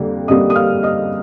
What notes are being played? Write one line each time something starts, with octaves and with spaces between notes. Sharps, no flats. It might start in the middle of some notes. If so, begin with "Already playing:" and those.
Already playing: F2 D3 G3 A#3
F2 D3 G3 A#3 D#5 D#6
D#6
F5 F6
D#5 D#6